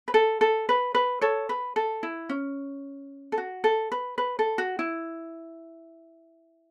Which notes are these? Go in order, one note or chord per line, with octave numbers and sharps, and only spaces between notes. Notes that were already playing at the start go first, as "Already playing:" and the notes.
B4
A4
A4
B4
B4
A4 C#5
B4
A4
E4
C#4
A4
F#4
A4
B4
B4
A4
F#4
E4